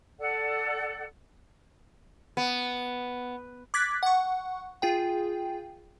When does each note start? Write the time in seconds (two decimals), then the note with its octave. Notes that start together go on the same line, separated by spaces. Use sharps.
0.19 A4 D5 F#5
2.37 B3
3.74 D6 F#6 G#6 A6 B6
4.03 F#5 C#6
4.82 F4 G#4 G5